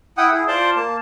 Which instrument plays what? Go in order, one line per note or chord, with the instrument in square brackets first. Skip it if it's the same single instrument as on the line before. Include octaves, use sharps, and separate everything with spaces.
[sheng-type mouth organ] E4 F#5 G5 D#6
E4 G#4
F4 C5 D5 A5 C6 D6
A#3 A5